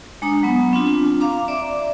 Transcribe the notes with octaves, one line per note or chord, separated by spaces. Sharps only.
G#3 D4 A#5 D#6
F#3 B3
C4 D4 F4
F5 A#5 D6
D5 E5 D6